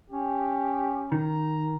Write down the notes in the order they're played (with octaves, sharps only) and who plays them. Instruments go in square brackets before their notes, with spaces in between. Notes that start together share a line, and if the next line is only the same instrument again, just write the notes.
[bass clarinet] C#4 [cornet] G4
[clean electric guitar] D#3 [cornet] A#5